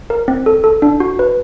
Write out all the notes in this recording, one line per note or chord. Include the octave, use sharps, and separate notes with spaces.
A#4
C4
A4
A4
D4
F#4
B4